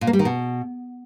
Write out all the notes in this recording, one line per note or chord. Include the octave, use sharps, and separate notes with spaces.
A#2
A#3
G3
D#3
B2